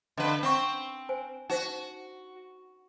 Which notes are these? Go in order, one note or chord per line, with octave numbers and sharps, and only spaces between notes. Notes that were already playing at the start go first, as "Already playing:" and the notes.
D3 B4 D#5 F5
C4 F#5 G5 C#6
C5 G#5
D#4 F#4 C5 F#5